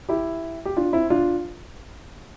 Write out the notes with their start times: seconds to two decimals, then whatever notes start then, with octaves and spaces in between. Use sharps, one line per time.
0.09 E4 G4
0.65 G4
0.76 D4 F4
0.93 C4 E4
1.10 D4 F4